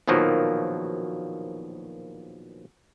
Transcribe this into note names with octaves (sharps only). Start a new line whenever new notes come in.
A#1 B2 D#3 F3 F#3 A#3